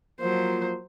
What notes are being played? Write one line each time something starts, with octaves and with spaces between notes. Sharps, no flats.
F3 F#3 A#3 C5